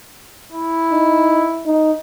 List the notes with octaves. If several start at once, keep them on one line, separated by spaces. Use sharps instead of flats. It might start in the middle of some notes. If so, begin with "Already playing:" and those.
E4
D#4
D#4